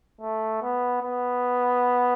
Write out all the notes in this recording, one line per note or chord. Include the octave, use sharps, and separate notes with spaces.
A3
B3
B3